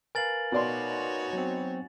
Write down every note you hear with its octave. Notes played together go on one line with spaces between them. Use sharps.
A#4 B4 F5 G#5 A6 F#7
B2 D#4 F#4 C#5 D5 C6
F#3 B3 C4